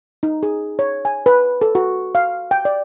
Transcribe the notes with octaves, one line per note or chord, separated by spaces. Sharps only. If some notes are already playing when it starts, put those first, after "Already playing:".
D#4
G#4
C#5
G#5
B4
A4
F#4
F5
G5
D5